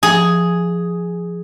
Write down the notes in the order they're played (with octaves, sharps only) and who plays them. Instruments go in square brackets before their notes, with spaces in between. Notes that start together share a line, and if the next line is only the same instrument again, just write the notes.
[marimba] F3 [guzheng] G#4